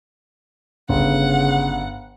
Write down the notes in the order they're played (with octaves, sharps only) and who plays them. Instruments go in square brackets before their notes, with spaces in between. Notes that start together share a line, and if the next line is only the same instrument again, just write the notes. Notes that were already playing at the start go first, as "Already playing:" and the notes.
[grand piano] G1 [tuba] C#3 [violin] F#5